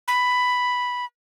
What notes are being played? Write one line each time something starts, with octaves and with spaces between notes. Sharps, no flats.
B5